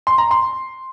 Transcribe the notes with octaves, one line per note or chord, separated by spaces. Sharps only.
C6
A#5
C6